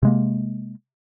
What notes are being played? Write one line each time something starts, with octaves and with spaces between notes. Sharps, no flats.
C3 G#3 A#3